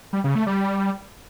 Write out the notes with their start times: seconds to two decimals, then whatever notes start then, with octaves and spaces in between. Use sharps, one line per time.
0.13 G3
0.24 C#3
0.35 A3
0.47 G3